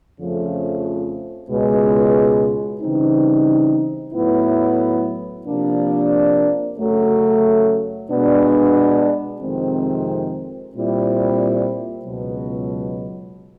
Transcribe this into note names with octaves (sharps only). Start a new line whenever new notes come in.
F2 C#3 F3 A3
C#2 B2 G#3
C#3 E3 G3 C4 D#4
A2 F#3 B3 E4
C3 F3 A#3 D4
F#2 C#3 F#3 A3
B2 G#3 B3 D4
F2 C3 D#3 G#3 C4
A#2 G3 C4 E4
C#2 B2 F#3